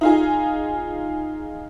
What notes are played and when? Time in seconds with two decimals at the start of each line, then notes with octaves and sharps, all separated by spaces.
0.01 D#4 F4 G#4